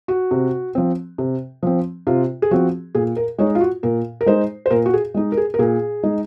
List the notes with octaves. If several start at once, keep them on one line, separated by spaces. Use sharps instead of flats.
F#4
C3
F3 C4
C3
F3 C4
C3 F4
G#4
F3 C4 F#4
A#2 G#4
A#4
G#3 D#4 C#5
F4
F#4
A#2 A#4
A#4
G#3 D#4 C5
C5
A#2 A#4
F#4
G#4
G#3 D#4
A#4
G#4
A#4
A#2 G#4
G#3 D#4